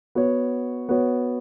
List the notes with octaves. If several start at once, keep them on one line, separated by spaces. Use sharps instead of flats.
B3 F#4 C#5
B3 F#4 C#5